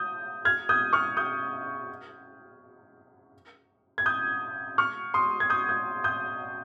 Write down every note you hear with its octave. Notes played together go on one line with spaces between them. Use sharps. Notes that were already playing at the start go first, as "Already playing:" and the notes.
Already playing: D#6 G6
F6 G#6
D#6 G6
C#6 F6
D#6 G6
G#6
D#6 G6
C#6 F6
C6 D#6
G#6
D#6 G6
D#6 G6
D#6 G6